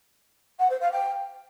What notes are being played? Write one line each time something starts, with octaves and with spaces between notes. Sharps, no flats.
F#5
C5
F5
G5